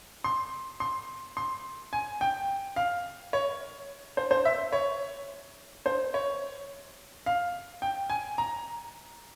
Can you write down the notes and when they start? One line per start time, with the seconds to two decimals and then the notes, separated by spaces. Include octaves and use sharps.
0.24 C6
0.80 C6
1.37 C6
1.93 G#5
2.21 G5
2.76 F5
3.33 C#5
4.17 C5
4.31 C5
4.45 E5
4.73 C#5
5.86 C5
6.14 C#5
7.26 F5
7.82 G5
8.10 G#5
8.38 A#5